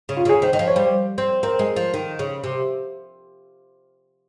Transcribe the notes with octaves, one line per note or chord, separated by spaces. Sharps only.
C#3
F4
C#3 G#4
D#3 C5
D#3 D#5
F3
C#5
G3 C5
C4
C4 A#4
G#3
F3
D#3
C#3
C3